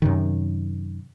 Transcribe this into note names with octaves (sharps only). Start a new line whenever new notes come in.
F#2 C3 D#3